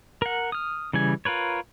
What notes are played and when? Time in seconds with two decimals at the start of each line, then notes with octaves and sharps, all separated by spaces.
0.22 A#4 F#5
0.52 D#6 F6
0.93 C#3 E3 G3 G#5
1.25 F4 A#4 B4 C#5